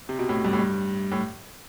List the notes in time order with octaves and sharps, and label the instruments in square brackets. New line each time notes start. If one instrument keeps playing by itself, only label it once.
[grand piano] C3
B2
A2
G2
A2
G2
A2